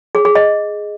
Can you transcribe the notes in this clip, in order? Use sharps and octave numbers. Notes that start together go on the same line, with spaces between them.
G#4
G#4
D#5